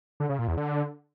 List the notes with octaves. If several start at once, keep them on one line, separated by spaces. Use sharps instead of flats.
D3
C#3
A#2
E2
D3